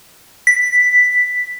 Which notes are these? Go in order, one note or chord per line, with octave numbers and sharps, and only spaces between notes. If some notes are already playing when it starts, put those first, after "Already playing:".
B6